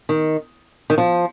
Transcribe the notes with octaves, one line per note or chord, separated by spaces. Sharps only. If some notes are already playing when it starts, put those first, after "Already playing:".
D#3
D#3
F3